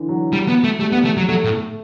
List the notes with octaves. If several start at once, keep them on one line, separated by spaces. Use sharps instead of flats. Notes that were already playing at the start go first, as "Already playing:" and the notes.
Already playing: D3 E3
F#3
G3
B3
A3
G3 A3
B3
A3
F#3
F#3 A3
A2
A3